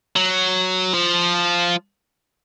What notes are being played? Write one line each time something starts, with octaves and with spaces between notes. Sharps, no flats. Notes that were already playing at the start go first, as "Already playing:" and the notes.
F#3
F3